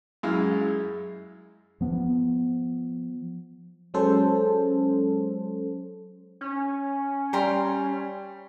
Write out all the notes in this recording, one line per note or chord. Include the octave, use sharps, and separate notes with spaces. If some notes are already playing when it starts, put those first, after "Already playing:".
F#2 G#3 E4 F5
F3 B3
F#3 G#3 C#4 A4 C5
C#4
G3 G5 A#5 C6